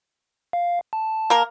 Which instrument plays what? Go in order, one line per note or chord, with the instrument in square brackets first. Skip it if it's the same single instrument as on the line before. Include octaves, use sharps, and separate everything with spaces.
[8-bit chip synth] F5
A5
[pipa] A#3 A#4